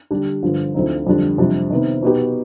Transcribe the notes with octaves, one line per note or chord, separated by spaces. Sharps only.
D3 G3 D4 G4
G2 D3 F3
D2 D3 F3 C4 D#4
F2 D3 G3 D4
F2 C3 G3 D4
C3 D#3 B3
B2 B3 D#4 G4